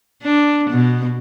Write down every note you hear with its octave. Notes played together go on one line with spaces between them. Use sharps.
D4
B2